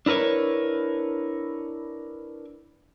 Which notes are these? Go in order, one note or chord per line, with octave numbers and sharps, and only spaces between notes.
D4 E4 A#4 B4 C#5